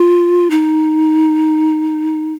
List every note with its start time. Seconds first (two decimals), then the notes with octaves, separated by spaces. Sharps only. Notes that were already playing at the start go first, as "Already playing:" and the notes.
Already playing: F4
0.50 D#4